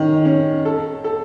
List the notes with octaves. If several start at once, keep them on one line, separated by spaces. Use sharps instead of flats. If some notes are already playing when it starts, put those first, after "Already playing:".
Already playing: D#3 C#4
C#4
A4
A4